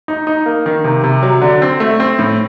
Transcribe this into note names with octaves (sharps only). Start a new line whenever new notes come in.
D#4
D#4
A#3
D#3
C3
C3
F#3
D3
C4
A3
C4
A2